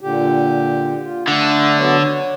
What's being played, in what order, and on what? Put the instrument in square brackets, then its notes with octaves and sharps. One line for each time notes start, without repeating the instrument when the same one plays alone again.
[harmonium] A#2 D3 G4
F4
[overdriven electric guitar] D3 [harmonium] A3 D4
[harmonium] F#3 B3 C#5
C#5